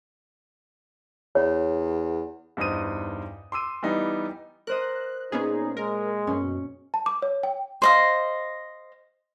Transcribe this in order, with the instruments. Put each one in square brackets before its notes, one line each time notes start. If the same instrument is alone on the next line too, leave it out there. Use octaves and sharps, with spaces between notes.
[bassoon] E2 [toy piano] C#5
[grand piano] E2 G2 D#4 C5 D#6 D#7
C6 D6 E6 D#7
E3 G3 B3 D#4
[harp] A#4 C5 D#5 [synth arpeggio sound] F#6
[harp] A#2 [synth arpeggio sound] B3 C#4 G#4 [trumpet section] D#4
[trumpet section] G#3 [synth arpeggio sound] A#4
[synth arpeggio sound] F#2 B2 [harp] C#4
[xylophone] A5
D6
C#5
G5
[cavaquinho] C5 D#5 F5